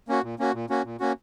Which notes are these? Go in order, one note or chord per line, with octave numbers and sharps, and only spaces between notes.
A#3 C#4 F#4
A#2
A#3 C#4 F#4
A#2
A#3 C#4 F#4
A#2
A#3 C#4 F#4